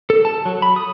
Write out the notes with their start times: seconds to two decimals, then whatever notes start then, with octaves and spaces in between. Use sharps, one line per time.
0.10 A4
0.25 A5
0.45 F#3
0.62 B5
0.76 D#6